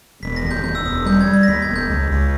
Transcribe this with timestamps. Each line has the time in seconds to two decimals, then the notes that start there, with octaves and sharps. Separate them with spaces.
0.23 E1 B6
0.36 A#6
0.43 D#2
0.51 G6
0.64 E1 G6
0.75 E6
0.86 E1 D#6
1.05 G3 G6
1.21 G#6
1.26 G3
1.33 G#6
1.43 A#6
1.48 D#2 B6
1.62 G#6
1.69 E1
1.76 G6
1.90 C#2
2.11 C#2